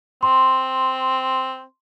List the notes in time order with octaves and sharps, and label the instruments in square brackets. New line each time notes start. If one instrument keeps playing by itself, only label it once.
[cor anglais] C4 [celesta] C6